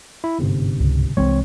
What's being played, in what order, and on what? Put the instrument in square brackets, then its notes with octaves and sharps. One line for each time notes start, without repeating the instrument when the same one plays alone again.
[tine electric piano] E4
G1 G#2 C3
[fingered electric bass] C#2
[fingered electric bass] C2 E3 G#3 [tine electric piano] C4 C#5